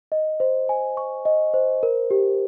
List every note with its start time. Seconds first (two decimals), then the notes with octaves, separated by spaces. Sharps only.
0.12 D#5
0.40 C5
0.69 G#5
0.97 C#6
1.25 D#5
1.54 C5
1.83 A#4
2.11 G4